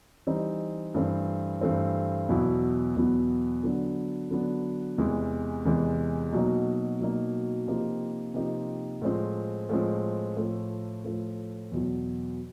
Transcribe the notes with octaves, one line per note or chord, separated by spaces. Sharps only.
E3 G3 C4 D#4
G2 E3 A3 C4
G2 E3 A3 C4
E2 B2 F#3 B3 E4
E2 B2 F#3 B3 E4
D3 F#3 B3 D4
D3 F#3 B3 D4
E2 C3 E3 G#3
E2 C3 E3 G#3
B2 F#3 A#3 D#4
B2 F#3 A#3 D#4
C3 F3 A#3 D#4 G4
C3 F3 A#3 D#4 G4
A2 F3 G#3 C4
A2 F3 G#3 C4
A2 F3 A3
A2 F3 A3
E2 B2 F#3